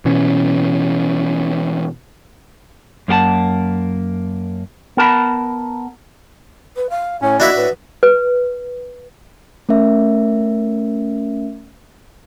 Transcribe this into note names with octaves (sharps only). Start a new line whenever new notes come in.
B2 E3 C#4
F#2 A#3 G4 F#5 A5
B3 A#4 A5 B5
B4
F5
A2 C#4 C#5
A#3 D4 E4 F#4 D#5 E5
A2 B4
B4
A3 C#4 A#4 E5